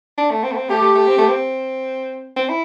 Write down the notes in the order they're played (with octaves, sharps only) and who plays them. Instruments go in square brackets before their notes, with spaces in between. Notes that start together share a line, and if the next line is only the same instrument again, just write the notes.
[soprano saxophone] D4
A3
C4
A3
C4
[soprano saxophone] A3 [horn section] G4
[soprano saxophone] A3
A3
C4
A3
C4
C4
E4